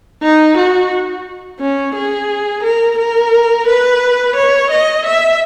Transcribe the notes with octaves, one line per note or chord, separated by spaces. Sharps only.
D#4
F#4
C#4
G#4
A#4
A#4
B4
C#5
D#5
E5